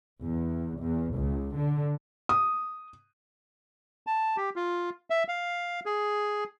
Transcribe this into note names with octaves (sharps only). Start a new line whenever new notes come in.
E2
E2
C#2
D3
D#6
A5
G4
F4
E5
F5
G#4